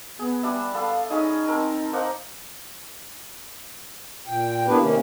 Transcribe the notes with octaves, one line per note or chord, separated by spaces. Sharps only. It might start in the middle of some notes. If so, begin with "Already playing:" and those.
B3 G#4
G3 D4 E5
B3 A4 F5
C#4 D#4 G#4 D#5
C4 A#4 A5
A#3 D#4 C5 F#5
A#2 G5
A#3 B3 D4 E4 G4 B4
C3 D#3 A#3 C#4